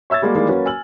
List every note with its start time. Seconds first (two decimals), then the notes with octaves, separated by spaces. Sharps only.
0.10 C#5 E5 E6 G#6 A6
0.22 G3 G#3 A#3 F#4
0.35 D#3 E3 G3 G#3 A#3
0.49 F#3 A#3 C#4 F#4 A#4 B4
0.66 G#5 E6 F6 F#7